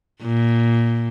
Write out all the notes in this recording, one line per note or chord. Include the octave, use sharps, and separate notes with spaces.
A#2